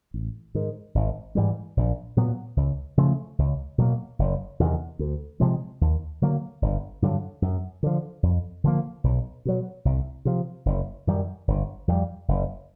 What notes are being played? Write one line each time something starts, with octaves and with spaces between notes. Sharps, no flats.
A1
G#2 D#3
G#1
G#2 E3 G3
A#1
A#2 F#3 B3
C#2
C#3 F3 A3
C#2
B2 F#3 A#3
F#1
E2 C3 D#3
D2
C3 F3 G#3
D#2
D3 F#3 A#3
G1
G2 D3 F#3
F#2
D3 F3
F2
D3 F3 A#3
B1
B2 F#3
C2
C3 F3
F#1
F#2 D#3 G3
G1
F2 D3 G3
F#1